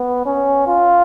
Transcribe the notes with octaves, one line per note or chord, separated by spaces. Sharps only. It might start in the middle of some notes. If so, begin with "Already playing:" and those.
Already playing: B3
C#4
F4